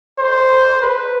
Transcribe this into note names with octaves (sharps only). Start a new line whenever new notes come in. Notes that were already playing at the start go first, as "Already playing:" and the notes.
C5
B4